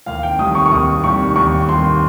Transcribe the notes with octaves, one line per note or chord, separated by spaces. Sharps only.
D#2 F5
G5
D#3 G3 D#6
C#6
C#6
D#2 D#6
D#3 G3 C#6
D#2 C#6
D#3 G3 C6